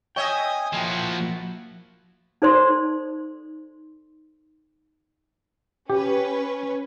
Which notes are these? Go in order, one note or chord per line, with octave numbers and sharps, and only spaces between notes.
C#5 D#5 E5 G5 G#5 D#6
F3 A#3 E4 F#4
D#4 A4 C5 D5 C6
C#4 G4 B4